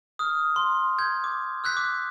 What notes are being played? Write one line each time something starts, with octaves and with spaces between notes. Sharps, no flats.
D#6 F6
C6
G6 G#6
D6
E6 F#6 G6 B6
D6